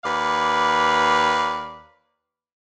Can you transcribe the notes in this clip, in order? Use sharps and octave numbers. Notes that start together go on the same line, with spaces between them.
D#2 B4 D5 F5